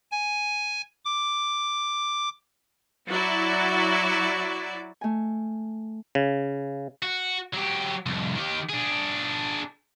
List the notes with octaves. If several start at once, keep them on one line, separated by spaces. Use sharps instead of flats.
G#5
D6
F#3 E4 F#4 D5
A3 G#5
C#3
F#4
F#3 G4
C2 F2
D#3 G4
D4 G#4